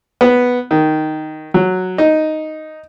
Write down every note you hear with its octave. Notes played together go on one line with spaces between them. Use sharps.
B3
D#3
F#3
D#4